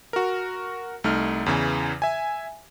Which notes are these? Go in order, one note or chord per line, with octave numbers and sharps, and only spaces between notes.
F#4 A#4
C2 A3 D#4 F6
E2 C#3 E3
E5 G#5